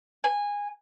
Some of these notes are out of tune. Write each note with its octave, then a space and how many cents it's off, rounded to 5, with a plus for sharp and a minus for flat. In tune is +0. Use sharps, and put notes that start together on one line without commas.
G#5 -20